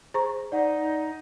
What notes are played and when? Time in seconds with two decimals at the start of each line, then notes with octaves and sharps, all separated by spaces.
0.14 G#4 C5 A#5 C#6
0.52 D#4 D5 F#5